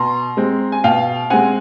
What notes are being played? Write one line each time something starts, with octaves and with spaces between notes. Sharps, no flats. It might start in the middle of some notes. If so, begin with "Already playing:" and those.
Already playing: B2 A#5 C6
G#3 C4
G#5
B2 F5 G5
G#3 C4 F#5 G#5